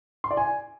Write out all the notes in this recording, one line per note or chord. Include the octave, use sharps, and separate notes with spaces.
C6
D5
G#5